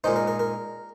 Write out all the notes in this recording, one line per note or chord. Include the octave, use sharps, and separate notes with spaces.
A#2 G#3 D#4 C5
A#4
A#4
A#4